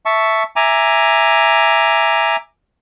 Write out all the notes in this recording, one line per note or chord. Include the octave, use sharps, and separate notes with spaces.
E5 A5 C#6
E5 G#5 A#5 D6